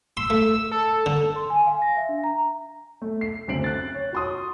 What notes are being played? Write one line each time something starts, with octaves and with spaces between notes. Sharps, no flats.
C6 E6
A3
A4
D3
C6
G#5
F5
A#6
E5
D4
A#5
A3
C7
D2 C#3 C4 C7 D7 F#7
F#6 A6
C#5
F#4 C6 D#6